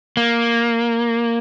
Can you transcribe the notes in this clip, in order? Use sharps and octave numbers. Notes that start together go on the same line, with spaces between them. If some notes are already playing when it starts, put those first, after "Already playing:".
A#3